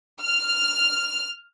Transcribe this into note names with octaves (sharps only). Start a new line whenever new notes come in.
F6